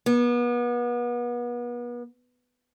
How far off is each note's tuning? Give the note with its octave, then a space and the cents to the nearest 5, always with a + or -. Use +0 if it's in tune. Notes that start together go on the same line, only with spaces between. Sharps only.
B3 -35